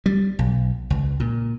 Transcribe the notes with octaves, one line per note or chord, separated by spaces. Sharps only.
G3
B1
C#2
A#2